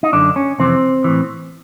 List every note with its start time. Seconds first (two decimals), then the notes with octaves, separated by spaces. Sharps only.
0.03 D#4
0.13 F#2 D3 D4
0.36 C#4
0.59 F2 C3 E3 C4
1.04 A2 E3